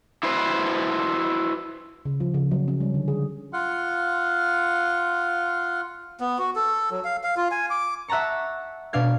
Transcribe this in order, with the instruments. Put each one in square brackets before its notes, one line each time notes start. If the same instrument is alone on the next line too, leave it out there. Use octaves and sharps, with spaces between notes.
[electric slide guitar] E4 F#4 B4 C5
[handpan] C#3
F3
C#3
F#3
C#4
G3
D3
G#4
[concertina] F4 F5 F#5
[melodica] B3
F#4
A4
F#3
F5
F5
F4
G#5
D6
[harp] E5 F#5 A5 A#5 C#6
B2 D4 F5 G#6